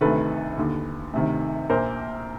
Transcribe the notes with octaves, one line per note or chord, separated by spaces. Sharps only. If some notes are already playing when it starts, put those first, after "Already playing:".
D2 C3 D#3 A4 B4
D#2 D3
D2 C3 D#3
A#1 A#2 A#4 C5